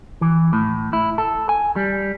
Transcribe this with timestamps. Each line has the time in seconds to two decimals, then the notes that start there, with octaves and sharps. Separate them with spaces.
0.21 E3
0.53 A2
0.93 E4
1.18 A4
1.49 G#5
1.76 G3